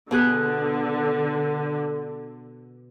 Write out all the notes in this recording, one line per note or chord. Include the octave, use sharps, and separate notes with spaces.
B2 D3 G#4 F#6